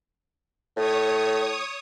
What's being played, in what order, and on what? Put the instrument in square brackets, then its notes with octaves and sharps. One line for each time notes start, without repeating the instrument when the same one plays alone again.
[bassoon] A2 [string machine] C#5 D#6